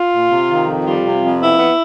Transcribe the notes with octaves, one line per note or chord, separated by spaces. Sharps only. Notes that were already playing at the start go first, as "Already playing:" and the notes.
Already playing: F4
A#2
C3
D#3
F2
G3 F4
C3
F2
B3 E4
B3